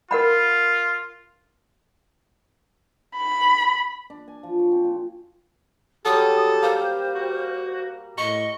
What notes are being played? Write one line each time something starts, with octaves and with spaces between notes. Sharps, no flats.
F4 A#4 F#5 B5
B5
D4
G#5
F3
C#5
C4
A#2
F#3 G3 G4 A4 D#6
A#3 C5 F5
F#4
A2 D#5 B5 C#6